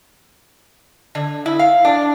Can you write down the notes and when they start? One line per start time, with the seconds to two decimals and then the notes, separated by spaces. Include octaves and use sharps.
1.15 D3
1.46 E4
1.59 F5
1.85 D4